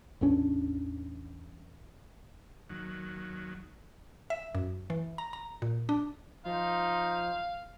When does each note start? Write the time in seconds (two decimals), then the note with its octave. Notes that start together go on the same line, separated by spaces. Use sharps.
0.21 A1 E2 C#4 D4
2.70 D#2 F#3
4.30 E5
4.55 F#2
4.90 E3
5.18 A#5
5.33 A#5
5.62 A#2
5.89 D4
6.45 F3 D#4 C5 F5